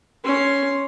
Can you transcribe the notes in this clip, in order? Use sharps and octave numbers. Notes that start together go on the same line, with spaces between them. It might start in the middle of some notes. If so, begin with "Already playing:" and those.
C#4 C6